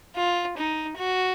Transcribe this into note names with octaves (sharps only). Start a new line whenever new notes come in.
F4
D#4
F#4